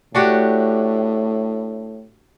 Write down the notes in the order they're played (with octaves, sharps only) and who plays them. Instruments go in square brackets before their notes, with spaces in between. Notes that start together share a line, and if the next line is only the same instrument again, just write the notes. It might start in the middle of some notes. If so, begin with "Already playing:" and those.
[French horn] A2 [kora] D4 F#4 G4